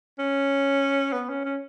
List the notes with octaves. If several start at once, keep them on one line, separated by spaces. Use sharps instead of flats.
C#4
B3
C#4
C#4